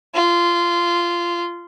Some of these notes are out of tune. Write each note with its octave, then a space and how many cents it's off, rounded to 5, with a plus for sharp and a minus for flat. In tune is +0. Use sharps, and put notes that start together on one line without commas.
F4 -15